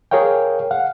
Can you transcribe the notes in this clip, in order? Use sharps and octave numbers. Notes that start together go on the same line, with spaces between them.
G#4 A#4 C#5 F5 G5
F5 F#5